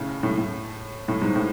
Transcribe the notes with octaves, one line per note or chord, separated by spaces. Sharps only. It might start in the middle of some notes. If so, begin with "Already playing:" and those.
Already playing: A2 C#3
A2
A2
A2
G#2
A2